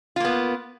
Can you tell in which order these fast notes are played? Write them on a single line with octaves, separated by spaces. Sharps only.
F4 A#3 B3